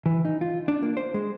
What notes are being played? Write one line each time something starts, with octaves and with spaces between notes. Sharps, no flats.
E3
D#4
F4
D4
A#3
C5
G#3